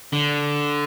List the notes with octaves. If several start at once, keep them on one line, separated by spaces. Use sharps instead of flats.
D3